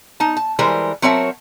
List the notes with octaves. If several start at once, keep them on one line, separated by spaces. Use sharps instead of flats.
D#4 A5
A5
E3 G3 G#3 A#4 C5
F#3 C4 A#4 C#5 E5 A5